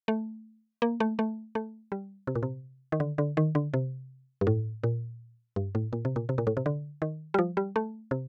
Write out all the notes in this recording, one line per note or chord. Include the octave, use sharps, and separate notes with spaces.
A3
A#3
A3
A3
A3
G3
C3
A#2
C3
D#3
D3
D3
D#3
D3
C3
G2
A2
A#2
G2
A2
A#2
C3
A#2
C3
A#2
A2
C3
D3
D#3
G3
F3
G3
A3
C3